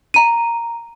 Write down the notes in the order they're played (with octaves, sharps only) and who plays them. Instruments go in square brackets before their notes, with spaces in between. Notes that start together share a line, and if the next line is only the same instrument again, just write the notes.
[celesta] A#5 D#7